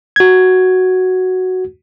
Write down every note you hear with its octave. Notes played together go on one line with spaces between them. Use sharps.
F#4 G#6